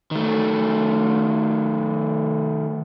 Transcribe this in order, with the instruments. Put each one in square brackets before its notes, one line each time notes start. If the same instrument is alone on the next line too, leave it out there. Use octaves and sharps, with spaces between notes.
[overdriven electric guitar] D#3 A3